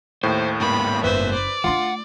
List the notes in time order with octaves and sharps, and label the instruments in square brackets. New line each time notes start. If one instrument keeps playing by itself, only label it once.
[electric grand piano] D#2 A2 [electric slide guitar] C5
[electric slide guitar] G#2 A#3 B3 [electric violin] B5
[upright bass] F#1 [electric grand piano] B4 [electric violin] C5 E5
[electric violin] D5
[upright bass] A3 D4 [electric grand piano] F4 C6 [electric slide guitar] F#5